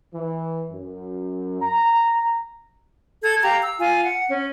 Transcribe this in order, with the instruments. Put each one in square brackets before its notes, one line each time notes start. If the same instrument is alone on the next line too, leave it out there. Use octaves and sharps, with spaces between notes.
[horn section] E3
F#2
A#5
[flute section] A4 G#6
G4 F5 A#5
E6
F4 G#5
F#5
C#4